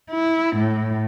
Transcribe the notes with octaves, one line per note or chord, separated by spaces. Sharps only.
E4
A2